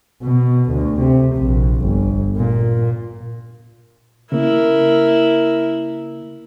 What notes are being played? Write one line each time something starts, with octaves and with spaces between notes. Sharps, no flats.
B2
D2
C3
A#1
G1
A#2
C#3 A#3 E4 A#4